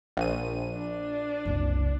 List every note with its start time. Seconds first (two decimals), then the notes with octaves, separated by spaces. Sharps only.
0.17 A#1 D#7
0.77 D4
1.45 F#1 C2